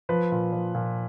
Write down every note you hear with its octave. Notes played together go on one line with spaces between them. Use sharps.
F3 B4
A#2
F3
A#2